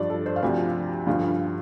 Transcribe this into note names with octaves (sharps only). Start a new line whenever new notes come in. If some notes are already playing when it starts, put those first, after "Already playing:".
Already playing: G2 F3 D5
A4
C5
F5
D2 C3 F3 D5
G2 D3 F3 F5